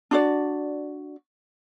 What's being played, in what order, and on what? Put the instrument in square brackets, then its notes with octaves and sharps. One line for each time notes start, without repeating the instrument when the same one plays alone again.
[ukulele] D4 F#4 D5